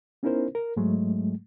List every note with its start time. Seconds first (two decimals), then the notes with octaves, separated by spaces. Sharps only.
0.23 B3 C#4 D#4 E4 A#4 C5
0.55 A#4
0.76 G#2 F#3 G#3 A3